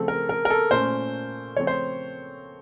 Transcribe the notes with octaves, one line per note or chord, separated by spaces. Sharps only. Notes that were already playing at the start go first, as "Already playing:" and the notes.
Already playing: C#3 F3 A3 C4 A4
A#4
A#4
A#4
A4
A#2 A3 C#4 C5
C#3 F3 A3 C4 C#5
C5